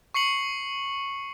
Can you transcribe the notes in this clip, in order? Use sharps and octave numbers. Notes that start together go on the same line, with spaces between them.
C#6 C7 C#7 F#7